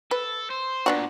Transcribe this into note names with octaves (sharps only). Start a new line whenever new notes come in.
A4 B4
C5
A#2 B3 D4 F#4